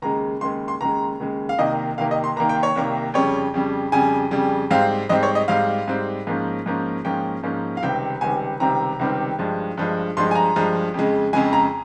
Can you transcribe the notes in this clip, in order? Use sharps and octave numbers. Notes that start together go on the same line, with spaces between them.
D#2 C#3 G#3 A#5
D#2 C#3 G#3 C6
C6
D#2 C#3 G#3 A#5
D#2 C#3 G#3
F5
C2 C3 D#3 A#3 D#5
C2 C3 D#3 A#3 F5
D#5
C6
C2 C3 D#3 A#3 A#5
G5
C#5
C2 C3 D#3 A#3
F2 C#3 G3 C#5
F2 C#3 G3
F2 C#3 G3 G#5
F2 C#3 G3
G#2 G3 C4 F5
G#2 G3 C4 D#5
C#5
D#5
G#2 G3 C4 F5
G#2 G3 C4
G#2 F3 A#3 C#4
G#2 F3 A#3 C#4
G#2 F3 A#3 C#4 G5
G#2 F3 A#3 C#4
F5
C#2 C3 D#3 G3 C4 G5
C#2 C3 D#3 G3 C4 G#5
C#2 C3 D#3 G3 C4 A#5
C#2 C3 D#3 G3 C4
G2 F3 G#3
G2 F3 G#3
G2 F3 G#3 C6
G#5
A#5
G2 F3 G#3
F2 C#3 G#3
F2 C#3 G#3 G#5
A#5